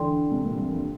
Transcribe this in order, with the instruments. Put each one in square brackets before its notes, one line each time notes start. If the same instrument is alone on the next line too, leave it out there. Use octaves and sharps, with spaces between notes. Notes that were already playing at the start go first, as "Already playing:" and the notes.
Already playing: [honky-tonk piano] D3 E3 [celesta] D4 A4 D5 G5 C6
[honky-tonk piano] C3
A#2
G2
F2